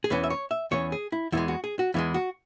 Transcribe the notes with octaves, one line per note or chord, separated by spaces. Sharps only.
G#4
E2 E3 C#4 B4
E5
C#5
E5
E2 E3 C#4 C#5
G#4
E4
E2 E3 G#3 E4
F#4
G#4
F#4
E2 E3 G#3 E4
F#4